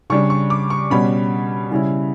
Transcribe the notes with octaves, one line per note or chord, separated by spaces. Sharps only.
C#3 G3 D4 C#6
C#6
D6
C#6
B2 G3 C#4 B5
C#3 G3 C#4 E4